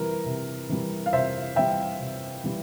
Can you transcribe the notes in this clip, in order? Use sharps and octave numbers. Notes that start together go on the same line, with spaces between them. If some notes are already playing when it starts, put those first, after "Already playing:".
Already playing: C3 E3 G3 A#4
C3
E3 G3
F5
C3 C5 E5
E3 G3 E5 G5
C3
E3 G3